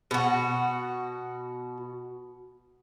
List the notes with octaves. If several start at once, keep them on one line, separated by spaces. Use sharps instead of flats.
B2 F#4